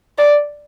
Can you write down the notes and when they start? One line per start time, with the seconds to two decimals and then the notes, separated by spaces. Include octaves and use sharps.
0.18 D5